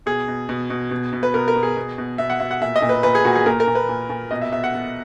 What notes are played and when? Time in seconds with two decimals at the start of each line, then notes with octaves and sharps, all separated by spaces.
0.06 B2 G#4
0.28 B2
0.49 B2
0.70 B2
0.91 B2
1.13 B2
1.23 B4
1.34 B2 A#4
1.48 A#4
1.56 B2
1.63 G#4
1.77 B2
1.98 B2
2.18 B2 E5
2.30 F#5
2.40 B2 E5
2.51 F#5
2.62 A#2 E5
2.76 D#5
2.82 A#2
2.89 B4
3.03 A#2 B4
3.15 G#4
3.25 A#2 F#4
3.36 G#4
3.46 A#2 A#4
3.60 A#4
3.67 A#2
3.75 B4
3.89 A#2
4.09 A#2
4.31 B2 D#5
4.42 E5
4.52 B2 E5
4.64 F#5
4.74 B2